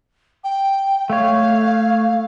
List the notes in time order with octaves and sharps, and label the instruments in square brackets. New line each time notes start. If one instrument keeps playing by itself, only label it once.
[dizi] G5
[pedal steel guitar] A3 C#5 [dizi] F5